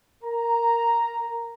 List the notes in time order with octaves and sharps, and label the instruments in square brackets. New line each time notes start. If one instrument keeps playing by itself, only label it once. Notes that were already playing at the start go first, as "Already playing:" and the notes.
[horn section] A#4 A#5